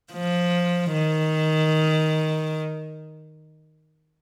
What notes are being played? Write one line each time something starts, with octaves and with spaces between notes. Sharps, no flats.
F3
D#3